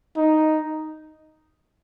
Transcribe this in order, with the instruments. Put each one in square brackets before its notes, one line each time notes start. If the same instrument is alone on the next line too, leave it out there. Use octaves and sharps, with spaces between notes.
[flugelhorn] D#4